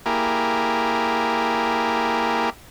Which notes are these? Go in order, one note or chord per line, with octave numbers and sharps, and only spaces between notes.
A#3 E4 G4 G#4 A#4